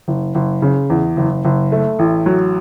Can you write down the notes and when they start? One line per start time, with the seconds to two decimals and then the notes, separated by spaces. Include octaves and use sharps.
0.08 F#1
0.35 F#1
0.62 C#3
0.90 E2
1.17 F#1
1.45 F#1
1.72 A3
1.99 A1
2.26 F#3